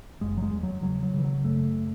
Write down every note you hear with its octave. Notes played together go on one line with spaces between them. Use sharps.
F#1 G#3
F#3
G#3
E2
F#3
C#3 F#3
F#3
C#3 E3
F#3
F#1 A3